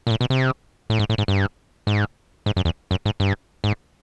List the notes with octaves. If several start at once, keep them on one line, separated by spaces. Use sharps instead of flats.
A#2
A2
B2
C3
A2
G#2
A2
G#2
G2
G#2
G#2
F#2
E2
F#2
G#2
G2
G#2